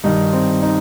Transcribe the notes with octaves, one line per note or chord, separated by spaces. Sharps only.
G2 D#3 D#4
C4
D#4